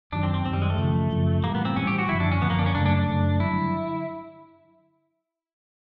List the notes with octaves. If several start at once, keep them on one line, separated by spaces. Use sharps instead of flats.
F#2 D#3 F#3 D4
C4
C4
F#2 D#3 F#3 C4
G3
G#3
A3
F#2 C#3 F3
F#2 C#3 F3
A2 E3 G3 A#3
B3
C4
A2 E3 G3 C#4
G4
F#4
F#2 D3 F3 E4
D4
C#4
F#2 D3 F3 B3
A#3
D4
C#4
F#2 C#3 F#3 A3 D4
D4
D4
F#2 C#3 F#3 A3
G2 D3 F#3 E4